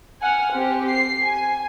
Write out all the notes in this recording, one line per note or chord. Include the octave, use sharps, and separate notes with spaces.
F#5 G#5 F6
C4 G4
C7
G#5